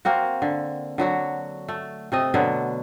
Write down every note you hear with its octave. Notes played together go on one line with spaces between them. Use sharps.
A#3 C4 F#4
D3
D3 F#3 F#4
A3
C3 A3 D#5
B2 D3 F#3